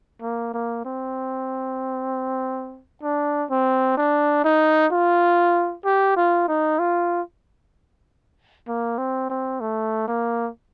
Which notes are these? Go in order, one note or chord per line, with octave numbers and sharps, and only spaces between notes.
A#3
A#3
C4
D4
C4
D4
D#4
F4
G4
F4
D#4
F4
A#3
C4
C4
A3
A#3